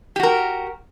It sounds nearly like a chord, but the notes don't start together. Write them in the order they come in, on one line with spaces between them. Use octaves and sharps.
G4 F#4 A#4